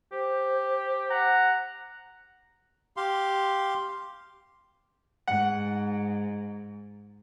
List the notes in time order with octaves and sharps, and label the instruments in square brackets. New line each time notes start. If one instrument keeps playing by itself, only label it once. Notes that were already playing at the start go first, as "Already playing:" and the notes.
[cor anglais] G4 [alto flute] C5
[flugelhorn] F#5 [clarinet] A#5
[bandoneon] G4 F5 C6
[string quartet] G#2 [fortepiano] F#5